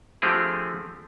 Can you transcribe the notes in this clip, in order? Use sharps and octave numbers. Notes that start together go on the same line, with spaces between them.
D3 F3 A3 C4 G4 G#4